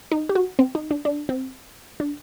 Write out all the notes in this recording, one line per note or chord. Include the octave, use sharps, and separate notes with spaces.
D#4
G4
F#4
C4
D#4
D4
D4
C4
D4